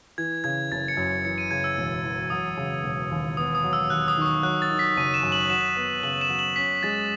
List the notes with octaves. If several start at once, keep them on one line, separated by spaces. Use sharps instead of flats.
E3 G#6
C#3 G#6
F#1 A6
C#7
F#2
E3 C#7
D#7
C#3 G#6
E6
E1
E2
F#3 D#6
C#3
E1
D#2
B3 D#6
D#6
F#3
E6
D#2 F#6
D#6
D#3 C#6
D#6
F#3 F#6
A6
D#3
B6
F#1 D#7
E7
F#2
F#7
F#4 E7
B3
C#3 F#7
E7
F#3
F#7
C#4 B6
G#3 A6